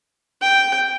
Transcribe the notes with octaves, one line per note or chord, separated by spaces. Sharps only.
G5